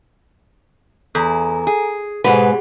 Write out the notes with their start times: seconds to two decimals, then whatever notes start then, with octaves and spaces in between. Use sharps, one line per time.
1.15 E2 A4 G#5 A#5
1.67 G#4
2.24 G#2 B2 G#3 G4 G#4 B4 F#5